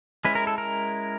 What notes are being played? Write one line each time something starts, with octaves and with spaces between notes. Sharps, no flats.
G#3 C#4 E4 B4
A#4
A4
A#4